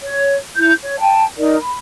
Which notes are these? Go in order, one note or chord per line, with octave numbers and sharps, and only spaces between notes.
C#5
E4 G6
C#5
G5 A5
D#4 A#4 D5
B5